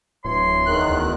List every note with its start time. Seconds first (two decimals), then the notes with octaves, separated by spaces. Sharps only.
0.25 D1 E3 C#5 C6
0.66 E2 D#3 F#6
0.90 D2